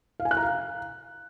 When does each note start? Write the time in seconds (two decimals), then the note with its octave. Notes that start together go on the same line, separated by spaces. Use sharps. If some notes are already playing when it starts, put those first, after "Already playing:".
0.20 F5
0.25 G#5
0.31 F#6
0.37 A#5
0.43 F5